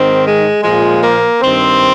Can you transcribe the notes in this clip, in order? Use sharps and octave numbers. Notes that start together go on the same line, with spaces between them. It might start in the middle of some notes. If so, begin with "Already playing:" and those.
Already playing: G#2 D#3 C4
G#3
A#2 F3 G#3
A#3
G2 D#3 C4